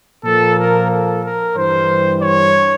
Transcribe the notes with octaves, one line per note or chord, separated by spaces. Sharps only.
A#2 F3 A#3 A4
A#4
A4
A#4
G2 E3 G3 C5
C#5